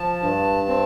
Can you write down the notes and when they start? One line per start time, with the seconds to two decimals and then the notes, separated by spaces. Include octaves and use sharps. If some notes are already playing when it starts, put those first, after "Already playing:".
Already playing: F3 A5
0.22 G2
0.68 C4